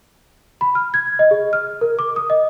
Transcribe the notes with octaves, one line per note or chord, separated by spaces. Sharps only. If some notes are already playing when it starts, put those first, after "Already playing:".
B5
F6
G#6
D#5
G#4
F6
A#4
D6
D#6
D#5